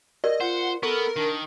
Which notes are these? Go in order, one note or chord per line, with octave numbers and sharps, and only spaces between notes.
G4 A#4 D5 D#5
F4 C5 F#5
B3 A4 A#4 C#6
D#3 D4